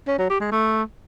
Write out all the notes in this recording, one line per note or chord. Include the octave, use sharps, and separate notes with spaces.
C#4
F#3
G4
G#3
A3